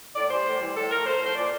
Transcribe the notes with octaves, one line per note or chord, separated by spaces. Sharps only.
A2 D5
E3 G3 C5
A2
E3 G3
A2 A4
F3 A3 A#4
A2 C5
F3 A3 C5
A#2 D5